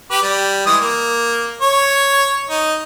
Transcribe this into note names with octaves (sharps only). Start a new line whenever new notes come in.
G4 B4
G3
E3 G#3 D#6
A#3
C#5
D#4